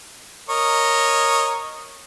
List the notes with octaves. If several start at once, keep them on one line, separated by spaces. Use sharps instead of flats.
A#4 C#5 D#5